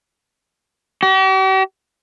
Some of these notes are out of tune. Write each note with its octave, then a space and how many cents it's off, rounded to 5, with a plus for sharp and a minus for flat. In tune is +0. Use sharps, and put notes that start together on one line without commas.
G4 -45